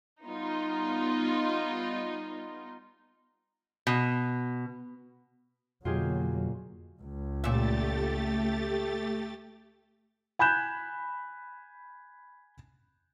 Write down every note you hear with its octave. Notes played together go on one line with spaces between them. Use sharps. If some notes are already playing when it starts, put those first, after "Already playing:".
G3 B3 D#4 F4
B2
F2 B2 D3 F#3 A#3 F4 G4 G#4
C#2
A#2 A3 G4 E5 A6
G#5 B5 F#6 G6 E7